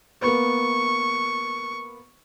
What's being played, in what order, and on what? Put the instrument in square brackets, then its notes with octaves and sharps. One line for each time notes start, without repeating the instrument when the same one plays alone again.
[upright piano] A#3 B3 [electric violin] C#6